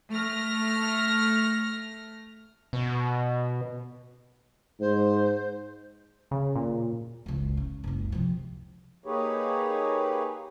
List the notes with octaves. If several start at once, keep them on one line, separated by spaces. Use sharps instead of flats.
A3 F6 A#6
B2
G#2 C5
C#3
A#2
F#1 C#2
C#3
F#1 C#2
C3 F3
A#3 D#4 G4 G#4 B4 C#5